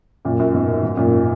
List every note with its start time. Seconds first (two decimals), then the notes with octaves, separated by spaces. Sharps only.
0.25 F#2 A#2
0.39 F#2 A#2
0.54 G#2 B2
0.83 G#2
0.97 F#2 A#2